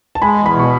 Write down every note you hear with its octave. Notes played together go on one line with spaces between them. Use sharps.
A5
G#3 G#5 B5
E2
B5
B2 C#6